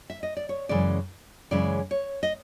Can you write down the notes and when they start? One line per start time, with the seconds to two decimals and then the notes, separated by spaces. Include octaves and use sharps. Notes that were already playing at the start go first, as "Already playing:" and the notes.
0.10 E5
0.23 D#5
0.37 D5
0.49 C#5
0.69 F#2 C#3 E3 G#3 C#4 D5
1.51 F#2 C#3 E3 G#3 C#4 D5
1.91 C#5
2.23 D#5